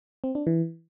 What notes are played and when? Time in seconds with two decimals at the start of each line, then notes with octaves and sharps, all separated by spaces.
0.24 C4
0.35 D4
0.47 E3